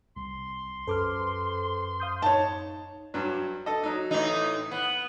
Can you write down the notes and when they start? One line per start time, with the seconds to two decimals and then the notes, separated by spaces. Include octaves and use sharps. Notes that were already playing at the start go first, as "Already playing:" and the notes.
0.16 C2 C6
0.87 F#2 A4 B4 C5 D6 F6
2.00 F5 D#6 G6
2.22 D#4 C#5 A5
3.14 G2 F#3
3.66 A4 D#5
3.84 F#3 D#4
4.11 A2 E3 D#4
4.71 B3